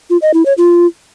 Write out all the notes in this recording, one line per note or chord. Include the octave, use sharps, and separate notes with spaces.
F4
D#5
E4
C#5
F4